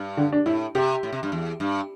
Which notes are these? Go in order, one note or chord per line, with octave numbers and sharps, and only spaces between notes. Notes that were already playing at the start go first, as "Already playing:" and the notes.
Already playing: G2
D3
D4
A2 E4
C3 G4
A2
C3
G2
E2
G2